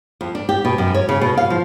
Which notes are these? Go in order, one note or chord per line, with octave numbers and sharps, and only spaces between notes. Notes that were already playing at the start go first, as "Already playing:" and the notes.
F2
D4
G4
B2
F#2
C#5
C#3
B2
F5
F3